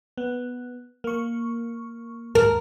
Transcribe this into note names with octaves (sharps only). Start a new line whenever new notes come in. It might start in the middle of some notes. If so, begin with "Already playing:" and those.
B3
A#3 C#6
D#2 G#2 A#4